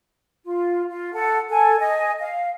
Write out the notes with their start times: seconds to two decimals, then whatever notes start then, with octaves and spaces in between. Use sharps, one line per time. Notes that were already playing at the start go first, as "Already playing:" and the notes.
0.45 F4
0.89 F4
1.14 A4 F#5
1.50 A4 G#5
1.79 D#5 G#5
2.20 F5